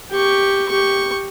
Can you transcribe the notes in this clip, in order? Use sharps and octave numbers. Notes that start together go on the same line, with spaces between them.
G4 C#6
G4 C#6